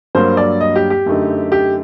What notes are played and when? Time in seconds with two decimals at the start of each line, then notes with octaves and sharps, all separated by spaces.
0.15 G2 F#3 A#3 C5
0.37 D5
0.61 D#5
0.76 G4
0.90 G4
1.06 F#2 D3 A3 D#4
1.52 G4